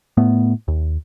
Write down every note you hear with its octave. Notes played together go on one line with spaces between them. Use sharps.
A2 A3 B3
D#2